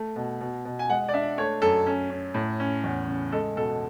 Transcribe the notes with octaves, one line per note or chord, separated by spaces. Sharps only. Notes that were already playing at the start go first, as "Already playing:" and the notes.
Already playing: A3
B2
B2
B2
G#5
G#3 F#5
D5
D4 E5
A3 C#5
F#2 A4
C#4
C#4
A2
C#4
E2
C#3
G#3 A4
B2 A4